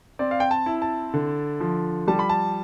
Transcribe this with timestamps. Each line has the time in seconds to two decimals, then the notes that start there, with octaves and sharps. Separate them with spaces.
0.19 C4 D5
0.31 F5
0.40 G5
0.51 A5
0.66 E4
0.82 A5
1.14 D3
1.60 F3
2.08 G3 A5
2.19 B5
2.29 A5